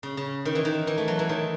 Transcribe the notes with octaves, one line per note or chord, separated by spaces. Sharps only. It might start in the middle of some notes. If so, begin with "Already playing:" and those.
C#3
C#3
D#3
E3
D#3
E3
A3
F#3
E3
D#3